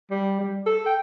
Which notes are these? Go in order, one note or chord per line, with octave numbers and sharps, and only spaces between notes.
G3
G3
A4
G5